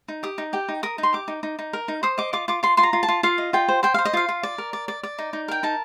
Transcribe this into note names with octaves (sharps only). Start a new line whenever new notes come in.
D#4
G4 D#6
D#4
G4 G5
D#4
A#4 D#6
D#4
C6
G4 D6
D#4
D#4
D#4
A#4
D#4
C5 D#6
D#5 D6
F4 D6
F4 D6
F4 C6
F4 C6
A#5
F4
A5
F4
F4 F5
D#5
F4 G5
C5
C5 G5
C5 F5
D#5
F4 F5
F4
D5
A#4
D5
D5
D5
D#4
D#4
A#4 G5
D#4 A5